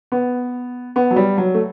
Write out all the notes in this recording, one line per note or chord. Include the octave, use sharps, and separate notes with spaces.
B3
B3
F#3
G3
F#3
A3